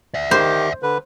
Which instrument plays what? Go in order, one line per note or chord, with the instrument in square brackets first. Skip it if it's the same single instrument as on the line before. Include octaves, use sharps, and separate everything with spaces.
[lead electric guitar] D5 E5
[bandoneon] D#3 G4 [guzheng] C5
[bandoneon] D3 B4